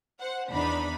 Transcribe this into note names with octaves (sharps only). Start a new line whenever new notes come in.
C5 F#5
E2 D4 D#4 B5